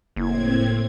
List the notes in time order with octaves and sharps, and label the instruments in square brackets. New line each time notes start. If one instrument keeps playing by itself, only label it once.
[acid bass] F#1 [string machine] A2 C4 G#6 [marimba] A#3 E4